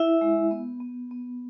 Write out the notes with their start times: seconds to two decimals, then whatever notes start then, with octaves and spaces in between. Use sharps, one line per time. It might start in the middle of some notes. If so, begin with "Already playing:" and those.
Already playing: E4 E5
0.21 G#3
0.51 B3
0.80 B3
1.11 B3